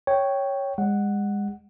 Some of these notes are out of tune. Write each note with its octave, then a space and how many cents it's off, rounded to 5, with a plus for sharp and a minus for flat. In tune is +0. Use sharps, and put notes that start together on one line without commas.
C#5 +0 G5 -5
G#3 -35 F#5 +0